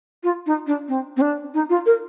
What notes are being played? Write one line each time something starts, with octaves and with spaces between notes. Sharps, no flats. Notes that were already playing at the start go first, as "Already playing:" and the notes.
F4
D#4
D4
C4
C4
D4
D#4
F4
A#4